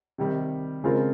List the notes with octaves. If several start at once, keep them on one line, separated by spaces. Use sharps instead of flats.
C3 D#3 G3
C#3 G#3 C4 F4 A#4